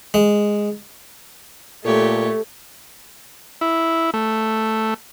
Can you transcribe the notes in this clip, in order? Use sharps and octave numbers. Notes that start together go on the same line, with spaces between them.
G#3
A#2 A3 G4 A4 C#5
E4
A3